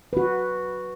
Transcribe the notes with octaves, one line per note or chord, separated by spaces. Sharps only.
F#4 B4